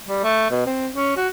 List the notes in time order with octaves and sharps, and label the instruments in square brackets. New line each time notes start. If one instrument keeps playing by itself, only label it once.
[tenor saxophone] G3
A3
B2
C4
C#4
F#4